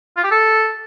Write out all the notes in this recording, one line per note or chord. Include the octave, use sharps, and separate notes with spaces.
F4
G4
A4